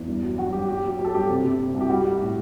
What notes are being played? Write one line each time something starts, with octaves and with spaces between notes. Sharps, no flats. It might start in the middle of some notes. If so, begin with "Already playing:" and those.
Already playing: E2
G2
F#3
F#3 F#4
G2 G4
F#3 G4
F#3
F#3
A4
G2 G4
C3
C3
C3
C2
G4
G3 F#4
G3
A2